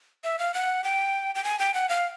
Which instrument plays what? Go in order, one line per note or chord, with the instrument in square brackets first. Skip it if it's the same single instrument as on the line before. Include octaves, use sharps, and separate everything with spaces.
[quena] E5
F5
F#5
G5
G5
G#5
G5
F#5
F5